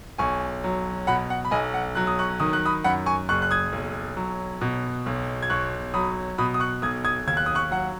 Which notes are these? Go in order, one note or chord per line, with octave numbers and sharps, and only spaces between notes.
B1 G#5 C#6
F#3
B2 F#5 B5
F#5
B5
B1 D#5 G#5
F#5
F#3 F#6
D#6
C#6 F#6
D#3 D#6
F#6
B5 D#6
F#2 F#5 B5
G#5 C#6
F#1 C#6 F#6
F#6
D#6 G#6
B1
F#3
B2
B1
G#6
B1 C#6 F#6
F#3 B5 D#6
B2 B5 D#6
D#6
C#6 F#6
B1 D#6 G#6
D#6 G#6
D#2 G#6
F#6
D#6
C#6 F#6
F#3 F#5